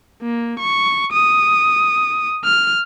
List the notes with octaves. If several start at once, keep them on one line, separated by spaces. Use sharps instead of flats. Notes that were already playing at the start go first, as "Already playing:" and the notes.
A#3
C#6
D#6
F6